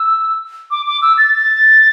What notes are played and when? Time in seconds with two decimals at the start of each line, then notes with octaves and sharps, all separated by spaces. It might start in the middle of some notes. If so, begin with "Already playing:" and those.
Already playing: E6
0.71 D6
0.86 D6
1.02 E6
1.18 A6
1.34 A6